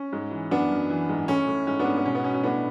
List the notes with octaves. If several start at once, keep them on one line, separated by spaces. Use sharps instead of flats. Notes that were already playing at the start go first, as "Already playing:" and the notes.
Already playing: C#4
G#2
E3
F#2 B3 D4
F#2
E3
G#2
A2 C#4
A2
G#2 C#4
B3 D4
G#2
B3
B2 C#4
B3
B2 C#4
C#4
A2 B3 D4